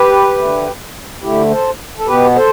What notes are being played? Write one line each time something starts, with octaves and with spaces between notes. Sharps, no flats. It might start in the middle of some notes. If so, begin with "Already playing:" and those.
Already playing: G4 B4
D2 D3 A3
D2 D3 A3 E4 G4
A4 C5
A4
B2 B3 G4 B4
A4 C5